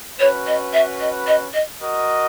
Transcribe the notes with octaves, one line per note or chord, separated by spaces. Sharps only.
C#4 F#4 B4 C#5
D#5
E5
D#5
D#5
D#5
F#4 A#4 D#5